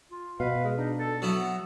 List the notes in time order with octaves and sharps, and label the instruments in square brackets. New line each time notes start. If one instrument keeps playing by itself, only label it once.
[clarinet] F4
[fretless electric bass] B2 [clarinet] B4 [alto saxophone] F5
[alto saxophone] G#3
[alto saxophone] D4 [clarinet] D#4
[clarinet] A4
[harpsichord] F#3 E4 [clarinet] B3 [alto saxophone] F#4